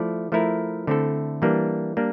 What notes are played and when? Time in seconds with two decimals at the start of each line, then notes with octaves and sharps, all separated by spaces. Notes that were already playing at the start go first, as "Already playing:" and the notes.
Already playing: F3 A3 E4 A4 D5
0.32 F3 A3 E4 A#4
0.87 D3 A3 C4 E4 A4
1.42 E3 G3 A#3 D4
1.97 G3 A#3 D4